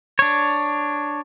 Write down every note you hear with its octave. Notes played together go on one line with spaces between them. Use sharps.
D4 C#5